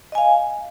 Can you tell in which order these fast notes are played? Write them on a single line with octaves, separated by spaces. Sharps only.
D#5 G#5 F5